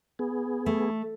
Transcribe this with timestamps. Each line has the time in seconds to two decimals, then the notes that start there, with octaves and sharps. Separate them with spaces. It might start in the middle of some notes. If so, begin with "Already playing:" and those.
0.19 B3 G#4
0.66 A3